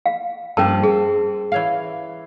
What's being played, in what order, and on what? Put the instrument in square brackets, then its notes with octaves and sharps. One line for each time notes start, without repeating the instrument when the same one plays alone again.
[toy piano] F5
[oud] G2 F3 A#3 [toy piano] C#4 A#4 A5
[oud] C4 [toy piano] G#4
[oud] E3 C#5 F5